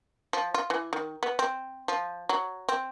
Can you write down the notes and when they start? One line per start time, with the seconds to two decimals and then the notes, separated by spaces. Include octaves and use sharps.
0.33 F3
0.54 F4
0.70 E3
0.93 D#3
1.23 B3
1.39 C4
1.88 F3
2.29 F#3
2.69 C4